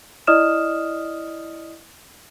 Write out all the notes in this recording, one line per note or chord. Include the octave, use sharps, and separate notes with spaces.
E4 D5 D#5 D#6 F6 E7